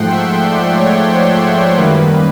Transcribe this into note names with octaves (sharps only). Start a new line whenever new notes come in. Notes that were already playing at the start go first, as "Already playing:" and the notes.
Already playing: G#2 F3 A3 F#5 G5 C6
E5
D5
C#5
C5
F#2 D#3 G3 A#3 B4